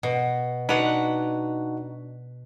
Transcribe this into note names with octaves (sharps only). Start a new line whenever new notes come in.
B2
D4 D#4 F#4 B4 F#5